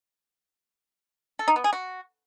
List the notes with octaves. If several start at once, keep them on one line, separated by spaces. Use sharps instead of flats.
A4
D#4
B3
G#4
F#4